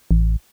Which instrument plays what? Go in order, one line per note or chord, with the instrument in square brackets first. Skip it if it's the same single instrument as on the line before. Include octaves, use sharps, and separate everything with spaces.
[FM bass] A1